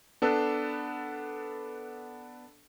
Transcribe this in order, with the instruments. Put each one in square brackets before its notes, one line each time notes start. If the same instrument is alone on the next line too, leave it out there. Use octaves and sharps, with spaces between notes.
[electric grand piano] B3 D4 A4 B4